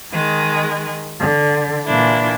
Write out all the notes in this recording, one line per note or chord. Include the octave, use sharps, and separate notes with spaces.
D#3 G#3
D3
A#2 E3 D4 E4